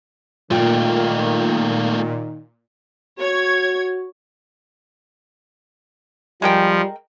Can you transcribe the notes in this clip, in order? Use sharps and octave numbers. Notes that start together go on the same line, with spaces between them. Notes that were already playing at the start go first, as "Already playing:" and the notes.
A#2 D#3 A3 A#3 F4 G5
F#4 C#5 G#6
F3 G3 G#3 A#4 G5